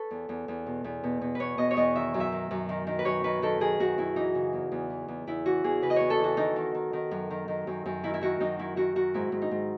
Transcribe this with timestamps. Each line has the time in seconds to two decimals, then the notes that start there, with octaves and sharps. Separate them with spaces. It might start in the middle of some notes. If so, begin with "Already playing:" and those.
Already playing: A4 B4 C#5
0.11 E2
0.29 E2
0.48 E2
0.66 B2
0.84 E2
1.04 B2
1.21 B2
1.35 E2 B4 C#5
1.58 B2 D#5
1.71 C#5
1.77 E2 D#5
1.95 D#3 E5
2.14 F#2
2.20 E5
2.32 D#3
2.51 F#2
2.69 D#3
2.87 D#3
2.99 B4
3.05 F#2 C#5
3.24 D#3 B4
3.42 D#3 A4
3.60 D#3 G#4
3.79 F#2 F#4
3.98 F#2 E4
4.16 E3 D#4
4.35 C#3
4.53 E2
4.72 E2
4.90 E3
5.08 E2
5.27 E2 E4
5.46 E3 F#4
5.64 E2 G#4
5.82 C#3 B4
5.90 D#5
5.96 E2 C#5
6.10 A4
6.19 E3 F#4
6.37 D#3 D#4
6.56 D#3
6.75 D#3
6.93 D#3
7.11 F#2
7.30 D#3
7.48 D#3
7.67 F#2
7.86 F#2
8.03 D#3 E4
8.14 E4
8.21 D#3 F#4
8.40 F#2 D#4
8.59 D#3 E4
8.76 D#3 F#4
8.95 D#3 F#4
9.14 G#2 E4
9.32 G#2
9.42 D#4
9.51 G#2